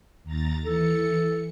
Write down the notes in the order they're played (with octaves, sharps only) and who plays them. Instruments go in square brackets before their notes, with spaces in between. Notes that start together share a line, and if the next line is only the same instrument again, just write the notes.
[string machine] D#2 A#5 A6
[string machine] E3 C#7 [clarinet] A4